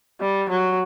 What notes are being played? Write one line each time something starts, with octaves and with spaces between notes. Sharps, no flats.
G3
F#3